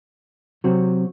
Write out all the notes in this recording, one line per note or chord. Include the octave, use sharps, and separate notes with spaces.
C3 F#3 C4 F#4